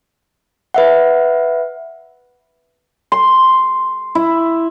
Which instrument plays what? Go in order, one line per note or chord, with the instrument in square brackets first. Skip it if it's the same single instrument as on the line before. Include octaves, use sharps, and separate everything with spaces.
[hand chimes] B4 E5 F#5
[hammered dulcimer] C6
E4